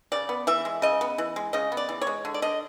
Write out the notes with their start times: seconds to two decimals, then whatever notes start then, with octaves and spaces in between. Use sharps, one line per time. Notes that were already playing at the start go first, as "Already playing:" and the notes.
0.12 C#3 D5
0.29 B3
0.47 E3 E5
0.65 G#3
0.82 C#3 D#5
1.01 B3
1.18 E3
1.36 G#3
1.53 C#3 D#5
1.72 B3
1.77 D5
1.89 E3
2.01 C#5
2.07 G#3
2.25 D3
2.34 D5
2.42 D3 D#5